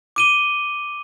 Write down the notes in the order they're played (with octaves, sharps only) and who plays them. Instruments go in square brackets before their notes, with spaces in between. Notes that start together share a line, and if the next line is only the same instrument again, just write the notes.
[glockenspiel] D6 D#7 G7